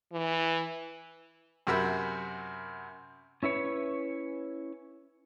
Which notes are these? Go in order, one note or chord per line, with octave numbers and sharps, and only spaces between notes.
E3
F#2 C3 F#4 A#4 B5 E6
C#4 E4 B4 C#5